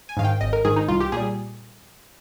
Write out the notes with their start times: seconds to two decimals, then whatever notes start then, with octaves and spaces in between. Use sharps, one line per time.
0.09 G#5
0.17 G#2 D#3 F5
0.24 G5
0.41 G#1 D#5
0.53 A#4
0.65 G#2 D#3 G#4
0.76 D#4
0.88 C2 F4
1.00 G4
1.12 A#2 G3 G#4